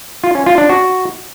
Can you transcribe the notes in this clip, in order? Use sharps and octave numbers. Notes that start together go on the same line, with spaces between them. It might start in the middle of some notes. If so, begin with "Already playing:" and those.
F4
C#4
F4
D4
F#4